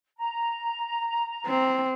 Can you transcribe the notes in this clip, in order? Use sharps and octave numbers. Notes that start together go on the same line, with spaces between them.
A#5
C4